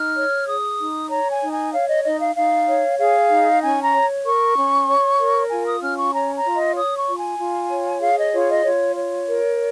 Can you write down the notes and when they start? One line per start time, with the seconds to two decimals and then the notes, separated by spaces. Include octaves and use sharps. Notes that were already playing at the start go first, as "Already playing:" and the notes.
Already playing: D#4 F6
0.15 C#5
0.47 G#4 D#6
0.79 D#4
1.10 C#5 A#5
1.31 G#5
1.42 D#4
1.52 G#5
1.73 C#5 F5
1.89 D#5
2.04 D#4 D#5
2.20 F5
2.35 D#4 F5
2.67 C#5
2.99 G#4 F5
3.30 D#4
3.61 C#4 G#5
3.83 A#5
3.93 C#5
4.24 A#4 C#6
4.56 C#4
4.88 C#5
5.19 A#4
5.51 F4 G#5
5.66 D#6
5.82 C#4 F6
5.97 C#6
6.13 C#5 A#5
6.35 A#5
6.45 F4
6.55 D#5
6.76 C#5 D#6
6.97 C#6
7.08 F4
7.18 G#5
7.39 F4
7.71 C#5
8.02 G#4 F5
8.18 D#5
8.33 F4 C#5
8.50 D#5
8.65 F4 C#5
8.97 C#5
9.28 A#4